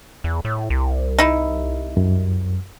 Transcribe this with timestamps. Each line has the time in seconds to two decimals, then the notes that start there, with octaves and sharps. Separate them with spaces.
0.24 E2
0.45 A2
0.70 C2
1.18 D#4 E4
1.97 F#2